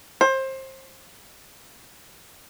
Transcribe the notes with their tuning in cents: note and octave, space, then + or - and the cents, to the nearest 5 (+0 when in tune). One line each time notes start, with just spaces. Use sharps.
C5 +25